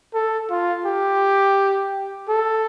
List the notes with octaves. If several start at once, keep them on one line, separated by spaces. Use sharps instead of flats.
A4
F4
G4
A4